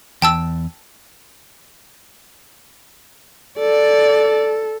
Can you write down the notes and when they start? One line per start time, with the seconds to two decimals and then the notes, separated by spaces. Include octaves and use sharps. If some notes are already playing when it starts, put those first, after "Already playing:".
0.22 E2 G5 A5 E6
3.59 A4 D5